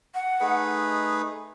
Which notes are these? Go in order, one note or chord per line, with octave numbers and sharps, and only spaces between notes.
F#5
A3 D#4 G#4 B4